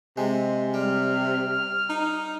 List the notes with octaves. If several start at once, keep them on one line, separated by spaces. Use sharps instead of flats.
C3 G#3
G3 F6
D#4